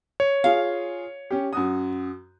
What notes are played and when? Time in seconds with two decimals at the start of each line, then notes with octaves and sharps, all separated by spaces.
0.20 C#5
0.44 F4 G#4 F5
1.30 C#4 G4
1.53 F#2 F#4 D#6